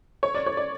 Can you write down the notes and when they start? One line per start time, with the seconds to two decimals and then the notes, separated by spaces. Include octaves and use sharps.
0.23 C#5
0.35 D5
0.46 C#5
0.57 D5